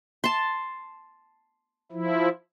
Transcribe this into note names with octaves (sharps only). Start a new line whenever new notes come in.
A5 C6
F3 E4